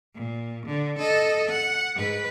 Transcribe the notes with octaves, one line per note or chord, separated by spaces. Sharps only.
A#2
D3
A4 D#5
F#5
G#2 B4